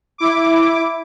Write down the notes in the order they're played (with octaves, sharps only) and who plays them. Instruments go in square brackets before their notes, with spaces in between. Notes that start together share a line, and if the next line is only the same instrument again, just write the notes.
[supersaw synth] E4 D6